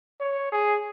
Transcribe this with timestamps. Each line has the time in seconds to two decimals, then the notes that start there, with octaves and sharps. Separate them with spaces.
0.20 C#5
0.52 G#4